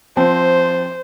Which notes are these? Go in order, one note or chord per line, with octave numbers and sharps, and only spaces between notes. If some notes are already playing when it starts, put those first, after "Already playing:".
F3 C4 C5